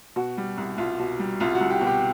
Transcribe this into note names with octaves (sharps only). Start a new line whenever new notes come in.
B2 F#4
G3
C2
C2 F4
B2
G3
C2 F4
F#4
C2
G4
B2
G4